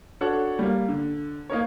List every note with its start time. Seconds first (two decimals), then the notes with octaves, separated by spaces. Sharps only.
0.21 D4 F#4 A4 C#5 F#5
0.59 G3 A#3
0.88 D3
1.50 A#3 D#4 A#4 C#5